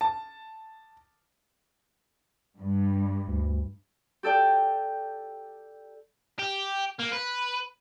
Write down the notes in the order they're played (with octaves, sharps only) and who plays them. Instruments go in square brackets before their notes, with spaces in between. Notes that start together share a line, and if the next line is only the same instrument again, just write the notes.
[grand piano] A5
[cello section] G2
[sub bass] D2
[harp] G4 A4 D5 G5
[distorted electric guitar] G4
A#3
B4